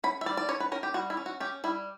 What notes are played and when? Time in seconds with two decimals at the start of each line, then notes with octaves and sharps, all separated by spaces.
0.04 C#4 B5
0.21 E5
0.26 G3 D5
0.37 D5
0.49 C#4 C#5
0.60 B4
0.72 C#4 A#4
0.83 G4
0.94 G3 F#4
1.10 E4
1.17 C#4
1.26 F#4
1.40 C#4 G4
1.64 G3 E4